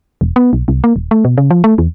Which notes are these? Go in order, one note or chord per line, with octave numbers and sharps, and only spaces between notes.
E1
B3
B1
C2
A#3
D#1
A3
B2
C#3
F3
A3
E2